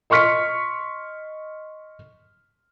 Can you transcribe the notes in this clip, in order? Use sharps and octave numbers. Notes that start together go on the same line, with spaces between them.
D#5 C6 C#6 F6 B6 C#7